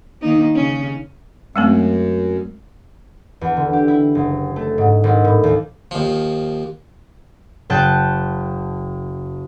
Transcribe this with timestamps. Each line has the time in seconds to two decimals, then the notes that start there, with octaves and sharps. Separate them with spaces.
0.21 D#3 A#3 D#4
0.55 C#3 C#4
1.56 F#2 G#3 A3 C4
3.41 E2
3.57 D3
3.73 G4
3.88 E4
4.15 F#1
4.56 A3
4.78 G#2
5.04 G#1
5.25 A2
5.43 D#2
5.91 D#2 F3
7.70 F#1 G5 A5 F#6 G6